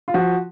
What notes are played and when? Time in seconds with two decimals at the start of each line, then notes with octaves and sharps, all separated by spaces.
0.08 F4
0.14 F3 F#4